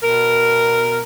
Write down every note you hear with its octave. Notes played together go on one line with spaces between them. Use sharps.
B2 A#4